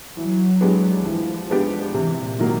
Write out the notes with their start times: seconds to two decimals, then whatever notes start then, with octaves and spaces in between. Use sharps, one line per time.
0.17 E3 F#3
0.61 G#3 B3 D4 G4
1.05 E3 F3
1.50 G#3 B3 D4 G4
1.94 C3 E3
2.24 A#2
2.39 D#3 F#3 A#3